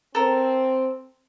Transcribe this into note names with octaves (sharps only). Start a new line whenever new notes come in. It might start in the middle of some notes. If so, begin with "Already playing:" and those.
C4 A4 A#4